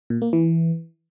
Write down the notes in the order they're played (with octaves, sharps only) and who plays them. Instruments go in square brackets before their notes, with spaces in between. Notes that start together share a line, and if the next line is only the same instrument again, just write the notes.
[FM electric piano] A#2
A#3
E3